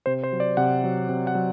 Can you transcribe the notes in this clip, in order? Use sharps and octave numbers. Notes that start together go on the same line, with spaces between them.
C3 C5
C5
F#3
D5
C3 F#5
F#3
C3
F#5
F#3